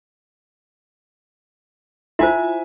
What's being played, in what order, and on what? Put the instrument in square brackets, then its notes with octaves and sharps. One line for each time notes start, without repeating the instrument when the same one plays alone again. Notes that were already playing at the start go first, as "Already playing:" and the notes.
[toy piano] E4 F4 C5 [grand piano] E5 G#5